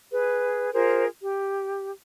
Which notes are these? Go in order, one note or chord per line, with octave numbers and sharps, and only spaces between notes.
G#4 B4
F4 G#4 A#4 C5
G4